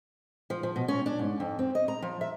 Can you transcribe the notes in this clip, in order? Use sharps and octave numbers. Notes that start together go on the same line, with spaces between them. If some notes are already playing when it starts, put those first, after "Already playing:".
F3
F3
B2
C#4
D4
G#2
F2
C4
D#5
A#5
F3
E5